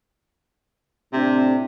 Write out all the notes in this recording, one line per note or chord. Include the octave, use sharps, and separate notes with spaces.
A2 C3 C4 D4